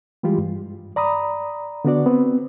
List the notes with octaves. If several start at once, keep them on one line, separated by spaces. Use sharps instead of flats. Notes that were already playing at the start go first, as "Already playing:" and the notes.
E3 G3 G#3 F4 G4
G2
D5 A#5 B5 D#6
D3 B3 D4 F#4 D5
B3 C4